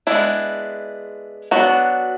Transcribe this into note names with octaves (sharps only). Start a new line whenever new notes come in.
G#3 B3 D4 E4
F#3 B3 D4 F#4